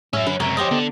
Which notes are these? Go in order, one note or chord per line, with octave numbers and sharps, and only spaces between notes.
A2 F#3 C#4 E5
D3 B4
C#2 F#2 C3 A#4 C#5
F3 C#4 G4 C5 D#5
D3 B3